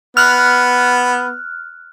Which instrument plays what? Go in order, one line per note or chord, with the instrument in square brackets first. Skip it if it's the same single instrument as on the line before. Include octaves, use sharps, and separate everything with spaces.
[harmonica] B3 [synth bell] F6 F#6